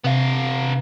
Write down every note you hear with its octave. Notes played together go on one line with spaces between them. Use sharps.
C3 B3 F5